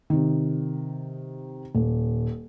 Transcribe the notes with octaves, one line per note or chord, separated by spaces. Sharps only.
C3 D#3
D#1